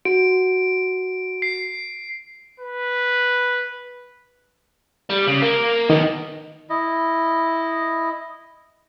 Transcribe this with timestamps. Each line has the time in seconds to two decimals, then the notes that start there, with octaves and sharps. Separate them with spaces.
0.05 F#4 D7
1.42 C7
2.60 B4
5.10 G3
5.28 C#3
5.43 A#3
5.90 D#3 B3 D#4
6.70 E4 D#5